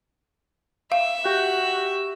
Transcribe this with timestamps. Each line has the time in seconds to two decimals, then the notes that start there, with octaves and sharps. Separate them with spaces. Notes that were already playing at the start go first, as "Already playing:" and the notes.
0.92 E5 F5
1.25 F#4 G4